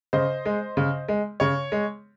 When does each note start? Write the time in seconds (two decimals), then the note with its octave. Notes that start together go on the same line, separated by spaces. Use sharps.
0.13 C#3 C5 D#5
0.46 G#3
0.77 C#3
1.08 G#3
1.40 C#3 C#5
1.72 G#3